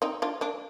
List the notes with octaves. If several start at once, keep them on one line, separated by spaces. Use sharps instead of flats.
C4 D#4
D4 F4
A#3 D4